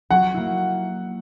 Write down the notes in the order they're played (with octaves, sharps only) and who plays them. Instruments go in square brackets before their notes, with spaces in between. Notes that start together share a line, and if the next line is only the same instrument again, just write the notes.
[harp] F#3 [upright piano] F#5
[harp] A#3 E4